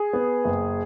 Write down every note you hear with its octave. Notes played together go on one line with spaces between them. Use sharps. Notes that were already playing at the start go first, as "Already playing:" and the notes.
Already playing: G#4
B3
F#1